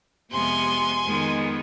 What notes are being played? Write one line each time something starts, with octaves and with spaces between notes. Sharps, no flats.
F2 C3 F3 G#3 B3 G#5 C6
F2 D#3 G#3 B3